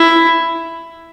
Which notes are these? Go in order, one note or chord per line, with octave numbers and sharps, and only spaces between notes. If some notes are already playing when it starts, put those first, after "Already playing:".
Already playing: E4